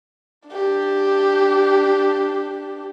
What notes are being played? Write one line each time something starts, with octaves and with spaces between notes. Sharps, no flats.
D4 G4